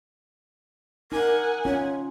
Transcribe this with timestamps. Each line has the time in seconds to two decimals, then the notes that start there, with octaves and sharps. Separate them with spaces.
1.12 D#4 A#4 F#5 G#5
1.65 C#4 F4 C#5